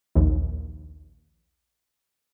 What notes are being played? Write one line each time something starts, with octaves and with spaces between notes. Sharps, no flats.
A#1 D#2